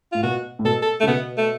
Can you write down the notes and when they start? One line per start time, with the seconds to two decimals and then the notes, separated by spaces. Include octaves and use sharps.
0.12 A2 F4
0.23 B2 F#4
0.59 A2
0.65 B2 A4
0.82 A4
1.01 A3
1.03 C#3
1.07 B2 B3
1.38 A3